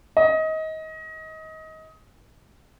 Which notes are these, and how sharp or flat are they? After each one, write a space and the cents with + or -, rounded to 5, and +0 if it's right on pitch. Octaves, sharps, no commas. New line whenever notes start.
D#5 +25